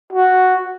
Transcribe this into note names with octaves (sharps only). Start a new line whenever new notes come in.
F#4